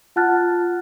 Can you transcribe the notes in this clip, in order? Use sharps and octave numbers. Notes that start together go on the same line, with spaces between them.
F4 F#5 A5 F6 F#6 A6